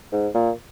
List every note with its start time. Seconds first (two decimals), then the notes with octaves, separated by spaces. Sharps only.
0.12 G#2
0.35 A#2